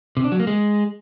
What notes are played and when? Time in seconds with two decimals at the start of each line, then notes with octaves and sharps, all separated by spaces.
0.17 C3
0.24 D4
0.32 F#3
0.40 A#3
0.47 G#3